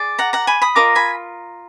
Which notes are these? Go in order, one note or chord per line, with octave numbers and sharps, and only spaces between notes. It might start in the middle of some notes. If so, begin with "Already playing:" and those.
Already playing: G#4 D5
F#5 A#5
F#5 A#5
G#5 B5
B5 D#6
F4 A#4 D#5 A#5 D6
G#5 B5